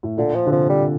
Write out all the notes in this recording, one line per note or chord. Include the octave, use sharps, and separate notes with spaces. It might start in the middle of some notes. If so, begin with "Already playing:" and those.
A2
A#2 D3
F3
D3
C3 F3
G3